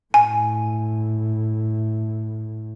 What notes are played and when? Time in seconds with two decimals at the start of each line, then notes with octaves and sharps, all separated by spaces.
0.14 A2 G#5